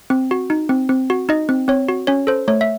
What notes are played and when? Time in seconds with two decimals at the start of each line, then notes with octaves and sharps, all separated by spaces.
0.10 C4
0.31 F#4
0.50 D#4
0.69 C4
0.89 C4
1.10 F#4
1.29 D#4 D#5
1.49 C4
1.68 C4 C#5
1.89 F#4
2.07 C#4 C#5
2.27 A4 C5
2.48 A3 C#5
2.61 E5